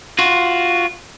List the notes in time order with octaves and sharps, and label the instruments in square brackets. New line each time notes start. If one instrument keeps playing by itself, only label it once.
[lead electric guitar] F4 F#4